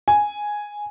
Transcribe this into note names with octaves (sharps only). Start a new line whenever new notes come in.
G#5